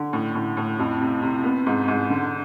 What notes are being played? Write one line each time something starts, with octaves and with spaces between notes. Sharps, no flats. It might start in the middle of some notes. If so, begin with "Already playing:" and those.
Already playing: D3
A2
A2
A2
F2
C3
C3
B3
G#2
G#2
D3